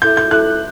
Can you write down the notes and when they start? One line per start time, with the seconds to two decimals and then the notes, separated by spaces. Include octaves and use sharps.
0.02 E4 A4 E5 G6
0.17 G6
0.31 E4 A4 E5 F#6